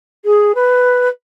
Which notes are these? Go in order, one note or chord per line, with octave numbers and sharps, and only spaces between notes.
G#4
B4